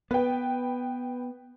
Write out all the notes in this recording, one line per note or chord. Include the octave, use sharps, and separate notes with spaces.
B3 B4 G5